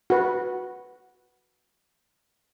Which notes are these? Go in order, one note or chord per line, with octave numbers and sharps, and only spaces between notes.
F#4 B4